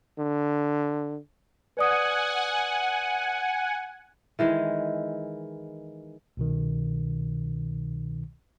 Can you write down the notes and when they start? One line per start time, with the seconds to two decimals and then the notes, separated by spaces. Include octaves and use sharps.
0.19 D3
1.77 B4 D5 F#5 G#5 D#6
4.39 D#3 E3 G#3
6.37 C2 B2 D#3